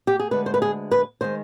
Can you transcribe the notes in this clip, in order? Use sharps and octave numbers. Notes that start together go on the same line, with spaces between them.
G4
G#4
D2 D3 G#3 B4
C5
B4
G#4
B4
D#3 G#3 C5